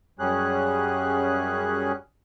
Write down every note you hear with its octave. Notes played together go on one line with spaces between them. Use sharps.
F#2 G3 C#4 G#4 F#6